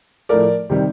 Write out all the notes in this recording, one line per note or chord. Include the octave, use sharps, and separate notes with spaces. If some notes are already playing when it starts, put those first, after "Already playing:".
A2 F3 A3 A#4 D5
C3 D#3 G3